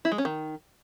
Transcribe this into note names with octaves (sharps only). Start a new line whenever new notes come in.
E4
G#3
C#4
D#3